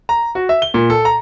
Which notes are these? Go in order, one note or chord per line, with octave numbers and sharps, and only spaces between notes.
A#5
F#4
E5
G7
A#2
A4
A#5